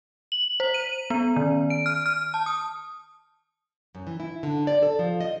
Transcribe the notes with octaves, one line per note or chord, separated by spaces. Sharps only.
F#7
C5
D#7
B3
D#3
D7
F6
F6
A5
D#6
F#2
E3
E4
D3
D5
A4
F3
D#5